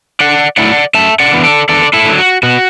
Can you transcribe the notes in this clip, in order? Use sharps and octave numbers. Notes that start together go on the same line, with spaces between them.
D3 D5 F#5
F#3 A3 E4 D5 F#5
F#2 E5 A5
D5 F#5
E3 B3 D4
A4 D5
E2 A4 D5
E4 A4
D3 F#3
F#4
B2 F#4